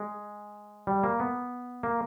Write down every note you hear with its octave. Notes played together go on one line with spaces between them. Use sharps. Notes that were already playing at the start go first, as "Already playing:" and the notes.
Already playing: G#3
G3
A#3
B3
A#3